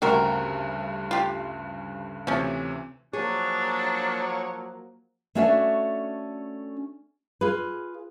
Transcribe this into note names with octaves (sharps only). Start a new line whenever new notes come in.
D2 G2 C#3 C4 F#4 A#4
F4 G4
D2 C3 E3 F3 C#4
F3 F#3 A#3 D4 G#4 C#5
A3 C#4 D4 F#4 C#5 E5
F4 G#4 B4